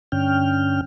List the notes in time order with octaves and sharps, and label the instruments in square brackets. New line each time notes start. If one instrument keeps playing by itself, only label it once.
[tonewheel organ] G2 D3 C#4 G5 F6